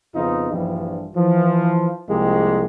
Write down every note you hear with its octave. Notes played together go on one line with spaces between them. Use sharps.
F2 C#3 B3 D#4 F4
A#1 G2 E3 F3 G3
E3 F3
C2 F3 G#3 A#3 G4